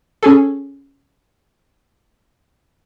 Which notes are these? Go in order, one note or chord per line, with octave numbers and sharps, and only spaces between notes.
C#4 G#4 A4